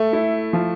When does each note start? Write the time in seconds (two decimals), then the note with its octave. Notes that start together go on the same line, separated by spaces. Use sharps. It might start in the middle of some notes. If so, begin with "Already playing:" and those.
Already playing: A3 A4
0.13 E4
0.53 F3